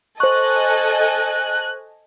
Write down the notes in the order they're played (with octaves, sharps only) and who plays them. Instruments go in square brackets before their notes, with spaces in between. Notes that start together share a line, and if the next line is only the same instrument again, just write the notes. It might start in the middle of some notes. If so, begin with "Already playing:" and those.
[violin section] A4 D#5 G#5 [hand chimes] C5 C#6 [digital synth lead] F#6